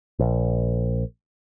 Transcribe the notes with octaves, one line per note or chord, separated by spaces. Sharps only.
A#1